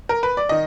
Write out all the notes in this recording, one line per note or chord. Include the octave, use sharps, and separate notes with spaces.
A#4
B4
D5
D#3 D#5